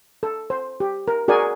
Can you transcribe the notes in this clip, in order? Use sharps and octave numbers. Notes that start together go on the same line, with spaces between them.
A4
C5
G4
A#4
F#4 G#4 A#4 D5 G#5